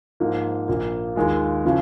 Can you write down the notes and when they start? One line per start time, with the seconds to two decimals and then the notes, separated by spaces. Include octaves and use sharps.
0.20 G#2 F3 A#3
0.68 A#1 A#2 A#3
1.16 D#2 D#3 G#3 F4
1.65 C#3 F3